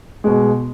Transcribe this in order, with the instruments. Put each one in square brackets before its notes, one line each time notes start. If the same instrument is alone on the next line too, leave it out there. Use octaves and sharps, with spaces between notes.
[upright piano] B2 G#3